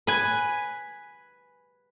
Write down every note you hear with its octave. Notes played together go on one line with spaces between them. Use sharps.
B4 G#5